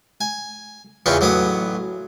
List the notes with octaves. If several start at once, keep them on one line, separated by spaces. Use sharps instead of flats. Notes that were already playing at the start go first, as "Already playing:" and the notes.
G#5
E2 C#3 B3 F4 G5 C#6
A1 F#3 B3 D6 D#6